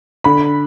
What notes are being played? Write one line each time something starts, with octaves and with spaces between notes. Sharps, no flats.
D3 B5